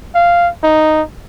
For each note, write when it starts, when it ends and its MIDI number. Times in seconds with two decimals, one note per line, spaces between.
0.15 0.49 77
0.63 1.02 63